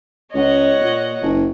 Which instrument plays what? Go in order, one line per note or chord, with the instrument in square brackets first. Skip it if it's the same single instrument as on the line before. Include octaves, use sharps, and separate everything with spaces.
[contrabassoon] C#2 [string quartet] C#5 D#5 F#5
[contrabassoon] A#2
F#1